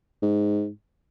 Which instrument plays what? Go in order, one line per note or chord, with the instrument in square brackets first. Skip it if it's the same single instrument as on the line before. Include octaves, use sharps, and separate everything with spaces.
[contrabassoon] G#2